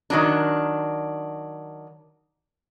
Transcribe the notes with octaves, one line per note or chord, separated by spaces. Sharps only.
D#3 F#3 D4